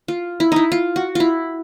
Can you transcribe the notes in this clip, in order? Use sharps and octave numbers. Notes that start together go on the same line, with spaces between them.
F4
E4
D#4 E4
F4
F#4
E4 F4